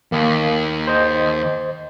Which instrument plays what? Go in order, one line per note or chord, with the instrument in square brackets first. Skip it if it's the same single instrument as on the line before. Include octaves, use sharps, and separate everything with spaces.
[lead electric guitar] D#2 [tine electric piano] A#3
[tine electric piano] C5 D#5